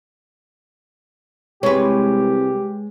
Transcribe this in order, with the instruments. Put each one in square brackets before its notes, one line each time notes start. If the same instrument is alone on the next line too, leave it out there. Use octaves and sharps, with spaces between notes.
[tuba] C2 [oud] G#3 B4 [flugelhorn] G4 [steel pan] C#5